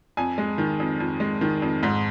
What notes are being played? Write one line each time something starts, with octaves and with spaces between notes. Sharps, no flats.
F2 G#5
G#3
D#3
F2
F2
G#3
D#3
F2
G#2